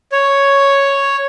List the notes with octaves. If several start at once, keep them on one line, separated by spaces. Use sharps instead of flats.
C#5